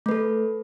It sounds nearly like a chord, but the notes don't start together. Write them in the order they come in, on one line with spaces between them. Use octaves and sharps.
A3 B4 A4